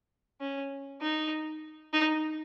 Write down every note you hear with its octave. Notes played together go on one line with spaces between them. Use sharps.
C#4
D#4
D#4